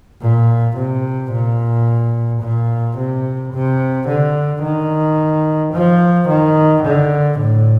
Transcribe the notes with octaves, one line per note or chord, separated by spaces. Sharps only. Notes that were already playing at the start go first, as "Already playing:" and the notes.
A#2
C3
A#2
A#2
C3
C3
D3
D#3
F3
D#3
D3
A2